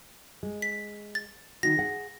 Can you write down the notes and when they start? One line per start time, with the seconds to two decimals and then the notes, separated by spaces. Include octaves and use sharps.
0.43 G#3
0.62 B6
1.15 A6
1.63 D#3 D#4 F#4 A#6
1.77 G#4 F#5